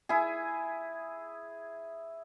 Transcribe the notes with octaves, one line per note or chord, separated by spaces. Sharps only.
E4 G#4